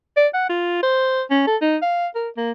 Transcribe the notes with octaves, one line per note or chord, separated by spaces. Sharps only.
D5
F#5
F4
C5
C#4
A4
D#4
F5
A#4
A#3